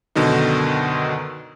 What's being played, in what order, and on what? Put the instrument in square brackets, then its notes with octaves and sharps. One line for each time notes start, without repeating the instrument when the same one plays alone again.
[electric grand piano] F#2 B2 D3 D#3 D#4